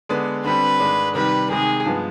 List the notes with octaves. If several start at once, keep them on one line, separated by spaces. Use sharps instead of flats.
D3 G#3 B3 D4
D3 G3 C4 B4
G#2 D#3 G#3 D4
C3 D#3 G3 B4
C3 D#3 G#3 G#4
G2 F3 G#3 B3